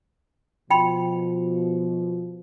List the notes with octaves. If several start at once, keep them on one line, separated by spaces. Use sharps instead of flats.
B2 F3 G5 B5 C6